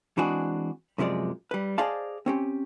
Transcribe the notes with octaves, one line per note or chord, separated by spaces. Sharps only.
E3 G#3 C4 D4 F#4 G#4
F#2 C3 F3 G#3 D5
G3 B4
G#4 C5 D5 D#5 F5 A5
C4 C#4 G4